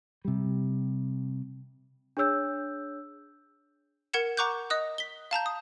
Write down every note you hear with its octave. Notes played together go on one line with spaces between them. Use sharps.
C3 G3
D4 G#4 C#5 E6 G6
A#4 F#5 G#6 C#7 E7
F#5 A#5 C#6 D6 F#6 G6
D#5 D#6 F#6
B6 G7
F5 A5 A#5 G6
D#6